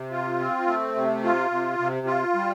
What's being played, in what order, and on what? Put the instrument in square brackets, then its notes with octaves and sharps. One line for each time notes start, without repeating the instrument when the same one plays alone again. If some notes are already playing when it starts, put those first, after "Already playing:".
Already playing: [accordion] C3
F4
C4
A3
C3
F4
C3
C3
F4
G3